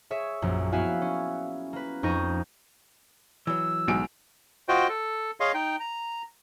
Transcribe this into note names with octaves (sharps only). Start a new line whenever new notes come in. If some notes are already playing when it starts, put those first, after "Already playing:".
G#4 C#5 E5
A#1 F#2
B3 E4 F#4 E5 F5 G#5
C#4
A#3 B4
F2 D#4 C#6 G6 A#6 D#7
E3 F#3 E6
B1 G#3 D7
F4 F#4 C5 D#5 G5
A4
G#4 C#5 D#5 F5 C6
D#4 G5
A#5